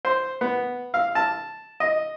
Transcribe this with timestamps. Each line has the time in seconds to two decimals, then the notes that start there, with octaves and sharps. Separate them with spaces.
0.05 C5
0.41 B3
0.94 F5
1.15 A5
1.80 D#5